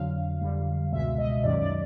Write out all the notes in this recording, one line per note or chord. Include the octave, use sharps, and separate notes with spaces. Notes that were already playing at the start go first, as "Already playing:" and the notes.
Already playing: F2 D3 F#3 F5
F2 D3 G3
C#2 B2 G#3 E5
D#5
F#2 D#3 F#3 D5
D5